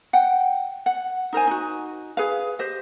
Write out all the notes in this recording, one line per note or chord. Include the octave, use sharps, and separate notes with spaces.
F#5 G5
F#5
D#4 A#4 C5 G#5
D#4 F#4
G#4 B4 F5
G4 C5 D#5